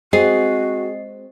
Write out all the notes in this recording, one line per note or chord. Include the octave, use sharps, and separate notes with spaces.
G#3 C4 F#4 G#4 D#5 C7